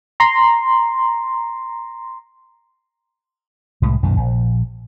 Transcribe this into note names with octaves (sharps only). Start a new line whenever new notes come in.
A#5 C6
C2 A2 G#3
B1 F#2 A#2 D#3
A#1